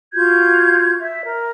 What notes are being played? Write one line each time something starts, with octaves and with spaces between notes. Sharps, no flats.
F4 F#4 G6 G#6
E5
A#4